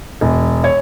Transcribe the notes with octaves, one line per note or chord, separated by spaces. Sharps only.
E1
C#5